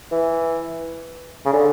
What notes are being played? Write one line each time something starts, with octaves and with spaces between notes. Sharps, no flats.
E3
C#3
D3